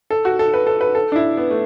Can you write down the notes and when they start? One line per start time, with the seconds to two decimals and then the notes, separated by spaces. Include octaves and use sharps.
0.10 A4
0.25 F#4
0.39 A4
0.54 B4
0.67 A4
0.81 B4
0.95 A4
1.12 D4
1.16 E4
1.37 B3
1.50 A3